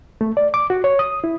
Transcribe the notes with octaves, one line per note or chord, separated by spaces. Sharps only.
A3
D5
D6
F#4
C#5
D#6
E4